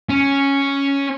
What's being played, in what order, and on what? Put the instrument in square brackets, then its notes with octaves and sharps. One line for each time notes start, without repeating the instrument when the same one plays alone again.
[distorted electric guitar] C#4